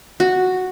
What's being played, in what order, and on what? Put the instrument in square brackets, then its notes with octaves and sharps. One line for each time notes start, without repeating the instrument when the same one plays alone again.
[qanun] F#4